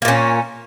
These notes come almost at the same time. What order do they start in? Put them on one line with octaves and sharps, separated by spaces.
A#3 A#2 C#4